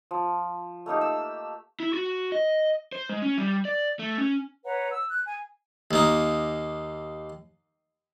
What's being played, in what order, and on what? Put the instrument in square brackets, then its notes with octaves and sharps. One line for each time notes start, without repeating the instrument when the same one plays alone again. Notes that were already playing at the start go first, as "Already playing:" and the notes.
[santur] F3
A3 A#3 D#4 G4
E6
[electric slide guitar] E4
F#4
D#5
C5
G#3
C#4
G3
D5
A3
C#4
[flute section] B4 C#5 F#5 A#5
E6
F#6
G#5
[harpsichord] D#2 A#3 D#4